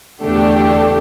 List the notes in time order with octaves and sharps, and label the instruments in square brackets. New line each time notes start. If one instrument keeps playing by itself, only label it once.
[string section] E2 D3 A3 D4 G4